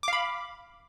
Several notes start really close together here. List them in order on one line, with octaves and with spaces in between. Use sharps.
D6 F5 B5